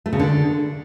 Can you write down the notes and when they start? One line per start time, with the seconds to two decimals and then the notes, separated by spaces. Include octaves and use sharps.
0.06 A3
0.13 C#3
0.20 D3